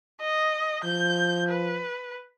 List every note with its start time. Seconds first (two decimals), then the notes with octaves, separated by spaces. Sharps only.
0.21 D#5
0.84 F3 G6
1.49 B4